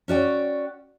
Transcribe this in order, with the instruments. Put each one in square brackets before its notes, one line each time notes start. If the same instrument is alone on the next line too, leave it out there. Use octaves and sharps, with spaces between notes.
[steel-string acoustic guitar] C#4 F#4 D5 G5